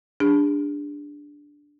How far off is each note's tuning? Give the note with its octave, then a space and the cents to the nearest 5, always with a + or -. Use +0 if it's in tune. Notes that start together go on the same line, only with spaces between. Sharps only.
D4 -5 G#4 -35